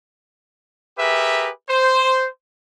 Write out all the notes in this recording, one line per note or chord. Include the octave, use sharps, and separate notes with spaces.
G4 G#4 A#4 B4 E5
C5